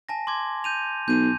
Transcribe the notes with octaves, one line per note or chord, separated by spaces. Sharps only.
G#5 A5 A#6
C6 D6 G#6
G6 D#7 F7
B1 G6 D#7